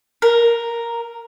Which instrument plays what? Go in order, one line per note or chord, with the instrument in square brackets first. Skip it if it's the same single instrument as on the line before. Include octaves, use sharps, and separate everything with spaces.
[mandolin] A#4